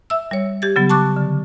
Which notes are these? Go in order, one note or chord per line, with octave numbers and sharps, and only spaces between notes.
E5 E6
G3 C#5
G4 G#6 A6
C#3 F#3 B3
A5 C#6 D6 F#6
D3